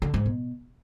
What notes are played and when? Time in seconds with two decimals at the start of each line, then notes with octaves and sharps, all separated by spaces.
0.02 D3
0.14 G#2
0.26 B2